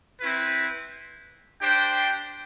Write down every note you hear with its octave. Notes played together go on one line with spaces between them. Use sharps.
C4 E4 B4
D4 G4 C5 G5